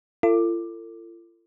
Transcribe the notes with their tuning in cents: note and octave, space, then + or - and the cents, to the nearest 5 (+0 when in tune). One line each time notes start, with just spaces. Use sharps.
F4 -45 A4 +35 D6 +10